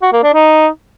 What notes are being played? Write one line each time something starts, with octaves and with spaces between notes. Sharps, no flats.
F#4
A#3
D4
D#4